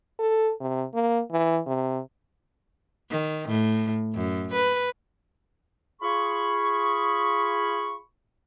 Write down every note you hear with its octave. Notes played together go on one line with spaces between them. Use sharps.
A4
C3
A#3
E3
C3
D#3
A2
F#2
B4
F4 G#4 B5 C#6